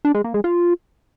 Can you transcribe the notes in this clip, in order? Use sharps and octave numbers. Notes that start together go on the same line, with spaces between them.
D4
G#3
A#3
G#3
F4